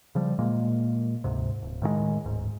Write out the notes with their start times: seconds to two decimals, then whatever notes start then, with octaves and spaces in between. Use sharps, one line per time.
0.15 C#3 F3 G3
0.39 A#2 G#3 A#3
1.24 D2 G#2 C3
1.62 D1
1.82 A2 D#3 E3 G#3
2.26 D1 G#2